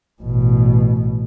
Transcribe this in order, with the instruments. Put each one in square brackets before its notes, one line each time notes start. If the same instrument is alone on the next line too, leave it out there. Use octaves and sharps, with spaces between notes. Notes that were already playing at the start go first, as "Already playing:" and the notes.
[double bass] A1 B2